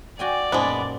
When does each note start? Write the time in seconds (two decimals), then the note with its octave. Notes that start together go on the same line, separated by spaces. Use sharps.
0.19 F#4 D5 G5 G#5
0.52 F#2 A#2 G#3 B3 D#4 C5